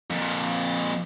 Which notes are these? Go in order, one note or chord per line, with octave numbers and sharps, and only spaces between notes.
F2 A#2